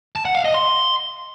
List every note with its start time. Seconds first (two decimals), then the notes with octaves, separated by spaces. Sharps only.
0.16 A5
0.25 F#5
0.35 F5
0.45 D#5
0.54 C6